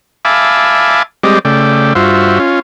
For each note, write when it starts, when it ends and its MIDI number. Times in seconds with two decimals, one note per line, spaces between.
0.25 1.03 76
0.25 1.03 77
0.25 1.03 80
0.25 1.03 81
0.25 1.03 83
0.25 1.03 86
1.23 1.39 55
1.23 1.39 56
1.23 1.39 60
1.23 1.39 67
1.23 1.39 74
1.23 1.39 75
1.45 1.93 49
1.45 1.93 57
1.45 1.93 74
1.45 1.93 79
1.95 2.39 43
1.95 2.39 65
1.95 2.39 66
1.95 2.39 72
1.95 2.39 76
2.39 2.60 61
2.39 2.60 65